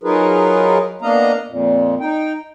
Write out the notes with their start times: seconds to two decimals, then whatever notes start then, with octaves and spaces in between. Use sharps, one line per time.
0.04 F#3 D#4 F4 G#4 A#4 B4
1.02 A#3 B3 D4 D#5 F5 A#5
1.48 F2 A#2
2.00 D#4 G5